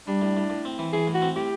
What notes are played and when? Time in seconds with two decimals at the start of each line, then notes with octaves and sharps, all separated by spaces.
0.07 G3 D4
0.21 A2
0.37 A2
0.50 A2
0.65 C4
0.79 E3
0.92 E3 G#4
1.07 A2
1.14 F#4
1.22 C4
1.36 A2 G4